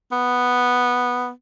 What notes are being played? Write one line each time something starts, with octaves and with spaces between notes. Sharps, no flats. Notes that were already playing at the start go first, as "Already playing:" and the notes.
B3